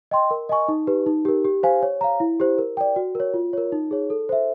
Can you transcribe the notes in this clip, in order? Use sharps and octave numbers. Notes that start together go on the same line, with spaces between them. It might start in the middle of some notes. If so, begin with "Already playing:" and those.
D#5 G5 C6
A#4
D#5 G#5 C#6
D#4
G4 B4
D#4
G4 A#4
G4
C5 F5 G#5
C#5
F5 A#5
E4
G4 C5
A#4
D5 G5
F#4
A#4 C#5
F4
A#4 C#5
D#4
G#4 C#5
A4
C5 E5